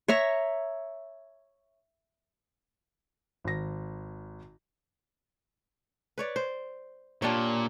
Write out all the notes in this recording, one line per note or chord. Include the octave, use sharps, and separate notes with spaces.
C#5 E5 A#5 C#6
G#1 A#6
B4 C#5 D5
C5
A#2 D4 G4 C#5